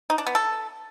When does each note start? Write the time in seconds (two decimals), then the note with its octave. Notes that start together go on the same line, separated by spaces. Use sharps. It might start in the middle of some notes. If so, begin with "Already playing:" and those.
0.10 D#4
0.18 D4
0.27 B3
0.35 A4